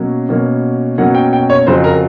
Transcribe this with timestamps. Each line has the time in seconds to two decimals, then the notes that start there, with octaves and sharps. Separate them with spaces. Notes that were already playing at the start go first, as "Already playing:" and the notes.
Already playing: B2 F#3 A#3 C#4
0.29 B2 F#3 A#3 C#4
0.98 B2 F#3 A#3 C#4 F#5
1.15 G5
1.33 G5
1.50 C#5
1.67 F2 C#3 F#3 C5
1.84 A#4